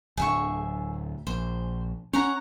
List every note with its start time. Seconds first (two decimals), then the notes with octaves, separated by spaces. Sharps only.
0.17 D1 D2 G#4 E5 C#6
1.27 A#1 C5
2.13 C#4 C#5 F#5 A#5